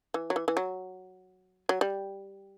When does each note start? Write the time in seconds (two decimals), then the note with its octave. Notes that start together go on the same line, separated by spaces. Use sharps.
0.14 E3
0.30 F#3
0.36 E3
0.48 E3
0.57 F#3
1.69 F#3
1.81 G3